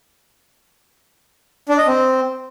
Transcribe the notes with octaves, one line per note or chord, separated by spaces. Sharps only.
D4
D#5
C4